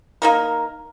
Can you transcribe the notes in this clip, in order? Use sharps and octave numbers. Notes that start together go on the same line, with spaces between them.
A#3 D#4 A#4